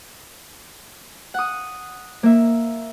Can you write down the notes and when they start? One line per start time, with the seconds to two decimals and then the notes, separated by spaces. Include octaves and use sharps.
1.34 F#5 D#6
2.23 A#3 E5